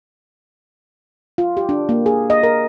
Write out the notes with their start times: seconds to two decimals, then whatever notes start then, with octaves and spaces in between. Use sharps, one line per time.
1.38 F4
1.57 G4
1.69 D4
1.89 A#3
2.06 G#4
2.30 D#5
2.43 A#4